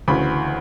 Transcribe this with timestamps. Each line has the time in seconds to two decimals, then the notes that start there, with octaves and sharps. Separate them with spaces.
0.08 D2 C#3 E3 B5